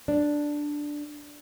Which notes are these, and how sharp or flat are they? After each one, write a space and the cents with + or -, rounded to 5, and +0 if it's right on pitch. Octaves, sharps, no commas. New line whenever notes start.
D4 +0 D5 +0